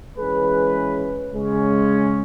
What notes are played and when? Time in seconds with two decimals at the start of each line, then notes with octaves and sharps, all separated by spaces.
0.16 E3 G#3 C#4 G#4 B4
1.34 C#3 G#3 C#4